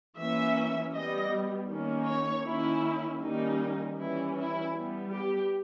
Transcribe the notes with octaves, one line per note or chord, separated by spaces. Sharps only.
E3 A#3 C#4 E5
G3 B3 D#5
D#3 A#3 C#4
C#5
D#3 A#3 C#4 E4
D#3 G3 A#3 C#4 D#4
E3 G3 C#4 E4
E4
G3 B3
G4